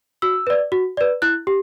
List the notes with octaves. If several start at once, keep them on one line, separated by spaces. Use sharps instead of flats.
F#4 E6
B4 D5
F#4
B4 D5
E4 F#6
G4